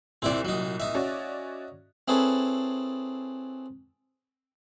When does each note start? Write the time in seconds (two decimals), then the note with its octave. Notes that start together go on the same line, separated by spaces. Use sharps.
0.22 C2 A#2 C4 E4 D5
0.45 F#3 D#4
0.80 D#4 E5
0.95 C#4 F#4 D5
2.08 C4 E4 G#4 A4 B4 C#5